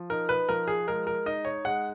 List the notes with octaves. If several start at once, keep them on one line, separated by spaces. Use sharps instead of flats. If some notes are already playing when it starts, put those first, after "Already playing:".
Already playing: F3
D#4 A#4
B4
F3 A#4
G#4
G#3 A#4
A#4
D#4 D#5
C#5
G#3 F#5